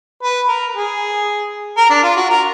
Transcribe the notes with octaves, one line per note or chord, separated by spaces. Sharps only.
B4
A#4
G#4
A#4
D4
F4
F#4
A#4